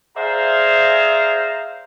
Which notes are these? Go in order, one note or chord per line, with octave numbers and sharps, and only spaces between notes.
G#4 C5 D5 E5 F5 A#5